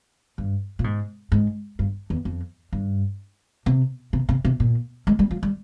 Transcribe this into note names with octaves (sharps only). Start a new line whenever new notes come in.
G2
A#2
G#2
G#2
G2
E2
F2
G2
C3
C3
C3
C3
A#2
G#3
G3
F3
G3